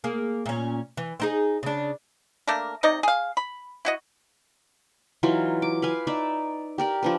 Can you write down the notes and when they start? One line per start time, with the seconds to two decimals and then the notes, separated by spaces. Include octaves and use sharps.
0.04 A#3 G#4
0.46 A#2 C#4
0.97 E3
1.20 C4 D#4 G#4
1.63 C#3 D4
2.48 A3 A#3 D4 A#4
2.83 C3 D#4 D5 D#5
3.03 G#4 F5
3.37 B5
3.85 E4 F#4 D#5
5.23 E3 F#3 D#4 F4
5.62 D6
5.82 B4 F5 G#5
6.07 D#4 D5 E5
6.78 G4 A#4 D5
7.03 F3 D4 B4